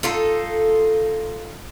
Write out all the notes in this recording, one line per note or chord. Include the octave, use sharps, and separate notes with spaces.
D#4 F4 A4